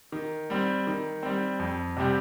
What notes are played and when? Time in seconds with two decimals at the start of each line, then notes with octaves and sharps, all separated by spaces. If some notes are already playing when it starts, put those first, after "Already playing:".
0.12 D#3
0.50 G3 C4
0.87 D#3
1.23 G3 C4
1.59 F2
1.97 C3 G3 C4 G4